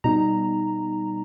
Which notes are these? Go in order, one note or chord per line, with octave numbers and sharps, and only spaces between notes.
B2 G3 B3 D#4 A#5